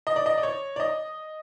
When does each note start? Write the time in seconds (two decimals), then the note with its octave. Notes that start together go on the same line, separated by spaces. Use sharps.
0.07 D#5
0.16 D5
0.26 D#5
0.38 D5
0.43 C#5
0.76 D5
0.80 D#5